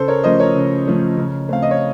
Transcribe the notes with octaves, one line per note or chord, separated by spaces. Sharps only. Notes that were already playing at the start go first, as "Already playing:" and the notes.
Already playing: C#3 A4 C5
A#4 C#5
F3 A3 C#4 C5 D#5
A#4 C#5
C#3
F3 A3 C#4
C#3
A3 C4 F5
D#5
C#5